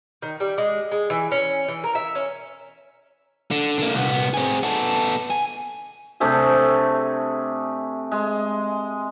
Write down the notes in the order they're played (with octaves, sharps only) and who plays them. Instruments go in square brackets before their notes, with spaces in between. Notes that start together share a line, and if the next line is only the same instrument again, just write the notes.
[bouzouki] D#3
G3
G#3
G#3
E3
C#4
E3
A#4
E5
C#4
[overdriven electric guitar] D3
D3 A#3
C2 B3
C4 G#4
B3 A4
G#5
[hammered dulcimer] C3 A3 D4 G#4
G#3